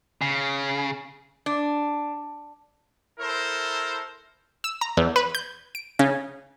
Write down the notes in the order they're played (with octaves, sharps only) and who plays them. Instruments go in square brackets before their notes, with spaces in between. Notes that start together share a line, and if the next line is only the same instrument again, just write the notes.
[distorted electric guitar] C#3
[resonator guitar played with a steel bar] D4
[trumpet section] E4 A4 A#4 C5
[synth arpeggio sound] E6
A#5
E2
B4
G6
D7
C#3